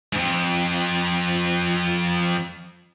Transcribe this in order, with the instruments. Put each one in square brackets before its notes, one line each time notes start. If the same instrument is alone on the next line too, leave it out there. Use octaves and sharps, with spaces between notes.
[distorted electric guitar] F2 G#2